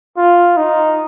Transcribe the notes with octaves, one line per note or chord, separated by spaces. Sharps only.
F4
D#4